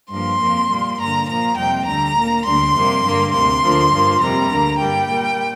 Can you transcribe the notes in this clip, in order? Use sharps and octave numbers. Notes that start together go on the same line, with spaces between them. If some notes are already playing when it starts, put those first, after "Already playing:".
G2 F3 A#3 C6
F2 F3 A#3
A#2 G3 A#3
G2 D3 A#3 A#5
A#2 F3 A#3 A#5
F2 C3 G3 G5
D2 D3 G3 A#5
A#2 A#3
D2 D3 G3 C6
F2 C3 G3 A#3
G2 D3 G3 A#3
D2 C3 A#3 C6
D2 D3 F3 A#3
G2 F3 A#3
F2 C3 G3 A#3 A#5
D2 D3 A#3
G2 G3 A#3 G5
A#2 G3 A#3